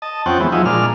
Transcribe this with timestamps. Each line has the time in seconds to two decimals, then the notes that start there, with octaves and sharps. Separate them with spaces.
0.02 D#5 A5
0.26 F2 C4 C#4 F#5 G5
0.40 E3 G#3 B3
0.52 F3 F#3 D#4 E4 G#4
0.65 A#2 G#3 D4 F6